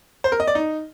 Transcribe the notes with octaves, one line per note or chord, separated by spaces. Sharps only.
C5
A#4
D#5
D5
D#4